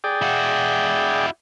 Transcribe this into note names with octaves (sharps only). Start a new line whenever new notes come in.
G#4 D5 G5
E4 F#4